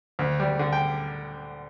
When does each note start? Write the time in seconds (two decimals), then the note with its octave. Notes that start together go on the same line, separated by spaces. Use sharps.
0.19 D2
0.40 G3
0.59 D3
0.73 G5